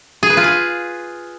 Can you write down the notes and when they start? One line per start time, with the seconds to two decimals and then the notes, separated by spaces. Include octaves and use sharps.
0.23 G#4
0.30 B4
0.37 F4
0.44 G#4